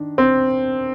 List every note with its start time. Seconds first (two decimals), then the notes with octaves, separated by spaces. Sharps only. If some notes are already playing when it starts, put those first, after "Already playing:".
Already playing: D#3 D4
0.18 C4